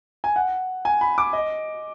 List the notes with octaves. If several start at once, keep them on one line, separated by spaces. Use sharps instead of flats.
G#5
F#5
G#5
B5
D6
D#5